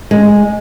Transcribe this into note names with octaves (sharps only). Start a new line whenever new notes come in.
G#3